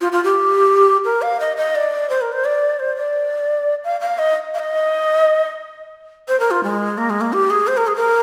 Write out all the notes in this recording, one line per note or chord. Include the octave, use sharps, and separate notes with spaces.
F4
F4
G4
A#4
F5
D#5
D#5
D5
C5
A#4
C5
D5
C5
D5
F5
F5
D#5
F5
D#5
C5
A#4
F4
G#3
A#3
G#3
A#3
G4
G#4
C5
A#4
G#4
A#4